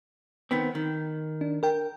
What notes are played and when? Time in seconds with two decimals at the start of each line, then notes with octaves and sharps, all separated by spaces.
0.51 D#3 B3 C4
0.75 D#3
1.41 D4
1.63 A#4 G5